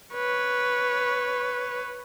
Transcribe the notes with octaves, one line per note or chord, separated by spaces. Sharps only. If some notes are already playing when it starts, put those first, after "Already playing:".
B4 C#5